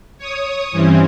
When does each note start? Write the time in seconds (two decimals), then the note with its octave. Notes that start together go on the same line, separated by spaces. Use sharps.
0.18 C#5 D#6
0.72 G2 E3 C4 C#4